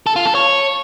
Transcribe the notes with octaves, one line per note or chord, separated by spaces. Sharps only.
A4
F4
A4
C#5